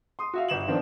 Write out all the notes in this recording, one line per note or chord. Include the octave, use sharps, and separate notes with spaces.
C6 D#6
F#4 E5 F5
G1 E7 F#7
D#3 F3 B3 C4 D4